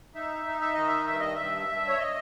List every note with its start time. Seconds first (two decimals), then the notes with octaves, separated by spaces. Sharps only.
0.15 D#4 E5
0.46 D#4
0.61 E5
0.74 D#3 D#5
0.87 E5
1.07 G2 E5
1.20 D#5
1.35 G2 E5
1.68 G2
1.88 C#5
1.99 D#5